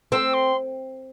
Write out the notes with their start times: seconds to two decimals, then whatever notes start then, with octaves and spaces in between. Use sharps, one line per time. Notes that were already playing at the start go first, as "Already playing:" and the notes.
0.12 C4 E6
0.33 C6